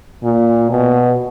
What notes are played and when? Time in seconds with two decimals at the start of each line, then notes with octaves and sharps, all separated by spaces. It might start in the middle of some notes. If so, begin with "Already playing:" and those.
0.24 A#2
0.70 B2